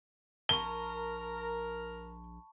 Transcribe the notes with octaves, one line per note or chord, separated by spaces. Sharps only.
A#1 A#4 A5 B5 C#6 G7